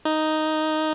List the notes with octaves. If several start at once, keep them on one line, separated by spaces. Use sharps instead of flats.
D#4